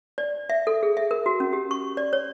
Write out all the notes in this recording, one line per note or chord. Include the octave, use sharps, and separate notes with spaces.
D5
E5
A4
G#4
E5
A#4
F#4
C#4
G4
C#6
D5
C#5